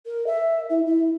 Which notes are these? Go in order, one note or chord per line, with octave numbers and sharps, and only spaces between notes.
A#4
E5
E4
E4